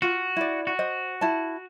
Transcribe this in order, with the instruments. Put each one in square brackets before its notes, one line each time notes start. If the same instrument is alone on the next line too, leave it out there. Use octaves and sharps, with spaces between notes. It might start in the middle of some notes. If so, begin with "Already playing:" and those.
[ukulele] F4 [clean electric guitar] F#4
[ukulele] E4 D5
[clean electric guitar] F#4
[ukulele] C5 D#5
E4 A5